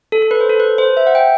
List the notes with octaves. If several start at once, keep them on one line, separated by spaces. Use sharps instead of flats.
A4
A4
B4
C5
A4
B4
C5
E5
F#5
G5